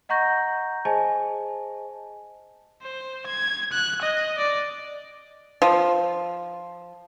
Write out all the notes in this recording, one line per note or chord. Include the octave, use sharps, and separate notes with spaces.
D#5 F#5 A#5 C#6 G6 A#6
G#4 C5 D#5 G#5 A5
C5
G#6
F#6
D#5
D5
F3